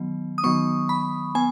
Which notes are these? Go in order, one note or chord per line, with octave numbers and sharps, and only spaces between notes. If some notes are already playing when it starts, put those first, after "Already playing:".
Already playing: D#3 F#3 B3
D#6
D#3 F#3 B3 C#6
B5
B3 G#5